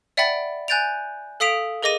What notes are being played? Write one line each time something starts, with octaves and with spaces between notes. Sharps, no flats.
D5 E5 F#5 G5 B5 A6
G#5 F#6 G6 A6 D7 F7
A4 F5 D#6 B6 D7 F7
G#4 A#4 D#5 D6 A#6 D#7